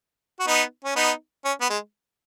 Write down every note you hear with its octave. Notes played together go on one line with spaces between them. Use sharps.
F#4
B3 D#4
C#4
B3 D#4
C#4
B3
G#3